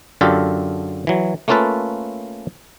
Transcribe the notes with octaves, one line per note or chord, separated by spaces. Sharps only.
F#2 D3 F4 G4 A4
E3 F#3
A3 A#3 C#4 F4 A4 B4